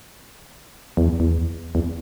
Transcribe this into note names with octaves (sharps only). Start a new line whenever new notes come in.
E2
E2
E2